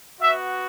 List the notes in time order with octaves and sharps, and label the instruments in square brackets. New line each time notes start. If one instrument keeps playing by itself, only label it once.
[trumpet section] B3 F#4 E5